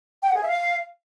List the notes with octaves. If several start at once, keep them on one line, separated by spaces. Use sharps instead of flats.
G5
F#5
G#4
E5
F5